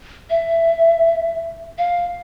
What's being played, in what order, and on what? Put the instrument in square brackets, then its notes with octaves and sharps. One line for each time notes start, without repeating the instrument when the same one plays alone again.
[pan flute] E5
F5